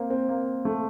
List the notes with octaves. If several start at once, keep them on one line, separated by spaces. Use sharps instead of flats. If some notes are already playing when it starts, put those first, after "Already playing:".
Already playing: A#3 C4
C4
A#3
A3